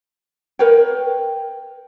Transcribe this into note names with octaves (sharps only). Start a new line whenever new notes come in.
A#4 B4 C#5 G5